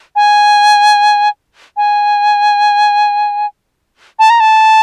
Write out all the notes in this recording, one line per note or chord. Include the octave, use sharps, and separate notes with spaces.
G#5
G#5
A5
A#5
A5